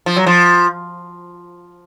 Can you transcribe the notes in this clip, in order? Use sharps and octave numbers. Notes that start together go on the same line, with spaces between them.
F3
F#3
F3